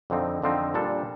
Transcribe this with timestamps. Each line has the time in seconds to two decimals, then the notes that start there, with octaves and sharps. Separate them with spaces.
0.10 F2 D3 F3 C4 D#4
0.42 F2 D3 F3 C4 D#4
0.74 A#2 G3 D4 A4